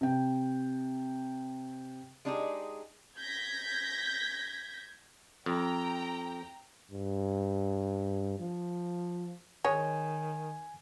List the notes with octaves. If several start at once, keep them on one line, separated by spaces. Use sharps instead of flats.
C3 G5
G#3 D4 D#4 G4 G#4
G6 G#6 A#6 B6
F2 G5 A#5
G2
F3
D#3 G#3 C#5 G#5